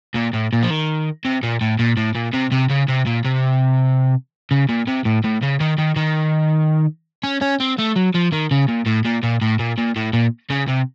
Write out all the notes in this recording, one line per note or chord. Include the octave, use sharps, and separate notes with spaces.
A#2
A2
A#2
F3
D#3
C3
A#2
A2
A#2
A2
A#2
C3
C3
C#3
C3
A#2
C3
C#3
A#2
C3
A2
A2
C#3
D#3
D#3
D#3
C#4
C#4
C4
A3
F#3
F3
D#3
C#3
A#2
A2
A#2
A#2
A2
A#2
A#2
A2
A#2
C#3
C3